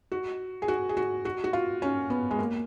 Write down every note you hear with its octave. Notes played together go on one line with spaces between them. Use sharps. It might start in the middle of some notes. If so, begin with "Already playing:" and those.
F#4
G#4
F#4
G#4
F#4
F#4
F#4
F4
C#4
B3
G#3
A#3